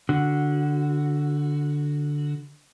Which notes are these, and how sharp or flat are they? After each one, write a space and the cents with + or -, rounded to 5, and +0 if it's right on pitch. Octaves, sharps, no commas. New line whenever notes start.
D3 +0 F#4 +0